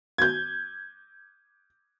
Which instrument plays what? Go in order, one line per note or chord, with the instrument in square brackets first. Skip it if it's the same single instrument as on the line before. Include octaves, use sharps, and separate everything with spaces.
[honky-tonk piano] G6 G#6